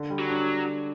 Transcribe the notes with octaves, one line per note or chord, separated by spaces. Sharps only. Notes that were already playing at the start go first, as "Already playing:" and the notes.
Already playing: D3
G3
F#3
D4